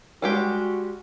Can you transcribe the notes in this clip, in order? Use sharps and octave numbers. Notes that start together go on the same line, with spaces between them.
G3 G#3 F#4 G4